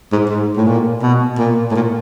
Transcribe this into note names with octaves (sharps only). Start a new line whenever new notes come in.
G#2
G#2
A2
A#2
B2
A#2
A2
A#2